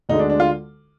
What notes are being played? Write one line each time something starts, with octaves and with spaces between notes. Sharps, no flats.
D2 D3 G#3 D#4
D4
D4
F4